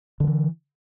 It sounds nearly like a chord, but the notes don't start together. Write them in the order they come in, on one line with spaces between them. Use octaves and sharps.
D3 F3 E3